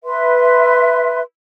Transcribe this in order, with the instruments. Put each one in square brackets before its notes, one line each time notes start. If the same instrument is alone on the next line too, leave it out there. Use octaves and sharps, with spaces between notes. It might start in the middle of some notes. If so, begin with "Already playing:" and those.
[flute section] B4 E5 C6